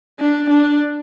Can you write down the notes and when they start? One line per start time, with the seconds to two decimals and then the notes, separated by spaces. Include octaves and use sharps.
0.20 D4
0.50 D4